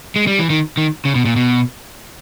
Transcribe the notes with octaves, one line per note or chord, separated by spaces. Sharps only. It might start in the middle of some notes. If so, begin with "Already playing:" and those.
G#3
G3
E3
D#3
D#3
C#3
B2
A#2
B2